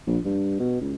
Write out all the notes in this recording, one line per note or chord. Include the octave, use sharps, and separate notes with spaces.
A#1
G2
B2
C#2